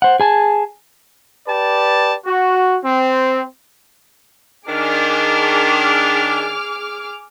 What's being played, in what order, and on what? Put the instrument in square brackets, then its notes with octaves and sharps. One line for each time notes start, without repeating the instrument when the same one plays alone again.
[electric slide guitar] C5 F#5
G#4 G#5 A5
[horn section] G4 B4 D5 A5
F#4
C4
[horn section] D#3 D4 [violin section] G#4 D6 F6